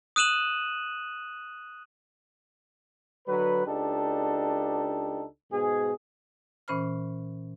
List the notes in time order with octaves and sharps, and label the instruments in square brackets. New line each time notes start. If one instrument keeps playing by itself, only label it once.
[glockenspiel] D#6 F#6 D#7 E7 F#7
[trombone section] D3 F#3 B4
C#2 D4 D#4 G4 A4
G#2 B2 G#4
[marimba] A#2 E3 C#4 C5 B5 F6